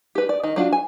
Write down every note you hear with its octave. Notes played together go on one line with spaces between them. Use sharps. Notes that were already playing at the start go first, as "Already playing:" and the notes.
G4 B4
D5
D#3 D#5
F#3 D4 F4 F#4
G#5